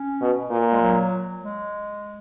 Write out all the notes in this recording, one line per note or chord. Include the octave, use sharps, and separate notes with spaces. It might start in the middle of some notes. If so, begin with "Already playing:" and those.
Already playing: C#4
B2
A#2
G#3
F#3
G#3